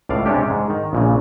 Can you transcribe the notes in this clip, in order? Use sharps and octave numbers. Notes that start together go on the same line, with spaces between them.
C#2 A2 D5 F5
C3 G#3 C#4 D4 G4
G#2
D#3
A#1 A#2 C#3